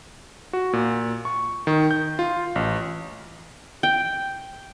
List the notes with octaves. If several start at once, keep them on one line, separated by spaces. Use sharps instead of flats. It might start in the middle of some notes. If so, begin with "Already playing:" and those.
F#4
A#2
C#6
D#3
G6
F4
A1
G5